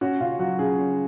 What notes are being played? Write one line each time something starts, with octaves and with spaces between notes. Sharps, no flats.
C#4 F#4
C#3 F4
F#3 F#4
C#3 G#4
C#4